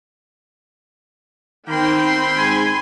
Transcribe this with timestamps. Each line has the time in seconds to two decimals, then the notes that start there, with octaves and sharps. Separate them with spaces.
1.68 D#3 A#3 C4 G5 B5 C6
2.38 G#2 G#5